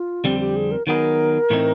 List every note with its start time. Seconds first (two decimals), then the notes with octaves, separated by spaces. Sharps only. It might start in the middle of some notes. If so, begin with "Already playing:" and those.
Already playing: F4
0.24 F2 D3 G3 C4 G4
0.40 G4
0.56 G#4
0.72 A#4
0.87 D#3 F#3 B3 D#4 G#4 A#4
1.50 A2 E3 A3 C4 D#4